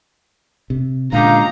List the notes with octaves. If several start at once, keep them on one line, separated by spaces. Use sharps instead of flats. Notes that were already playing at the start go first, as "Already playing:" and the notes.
C3
C#2 A#2 D3 D#4 G4 F5 A#5